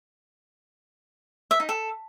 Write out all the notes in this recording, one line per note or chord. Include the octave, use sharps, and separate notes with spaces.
E5
D#4
A4